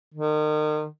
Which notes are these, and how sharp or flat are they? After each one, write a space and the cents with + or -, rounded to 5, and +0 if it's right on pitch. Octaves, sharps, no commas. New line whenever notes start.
D#3 -35